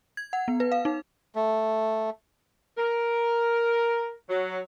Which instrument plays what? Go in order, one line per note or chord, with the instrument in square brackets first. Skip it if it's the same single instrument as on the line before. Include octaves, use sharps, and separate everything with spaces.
[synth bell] G#6
F#5
B3
B4
F5
D#4
[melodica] A3
[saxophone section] A#4
F#3